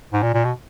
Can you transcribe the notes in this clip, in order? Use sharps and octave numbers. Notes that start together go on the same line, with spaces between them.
G#2
A#2
A#2
B2